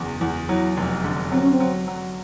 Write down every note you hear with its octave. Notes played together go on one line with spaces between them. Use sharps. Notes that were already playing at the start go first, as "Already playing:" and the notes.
Already playing: F#1 E2
E2 E4
F#3 E4
F1
D3
F#3 C4
C#4
C4
F#3
F#3